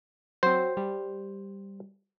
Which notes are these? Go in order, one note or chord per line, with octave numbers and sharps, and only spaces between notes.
F#3 C4 C5
G3